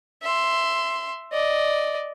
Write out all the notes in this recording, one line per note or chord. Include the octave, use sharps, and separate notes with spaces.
E5 C6
D5 D#5